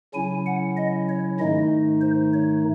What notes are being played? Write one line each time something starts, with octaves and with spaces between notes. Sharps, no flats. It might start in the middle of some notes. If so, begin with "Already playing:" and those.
C#3 F#3 C#4 E4 G#5
F#5
D#5
C#5
G#2 D#3 A3 D#4 D#5
C5
C#5